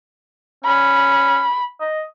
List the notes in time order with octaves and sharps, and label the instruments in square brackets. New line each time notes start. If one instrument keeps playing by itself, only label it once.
[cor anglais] C#4 [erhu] B5
[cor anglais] D#5